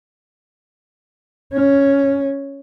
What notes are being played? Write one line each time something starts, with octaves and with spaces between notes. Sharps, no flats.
C#4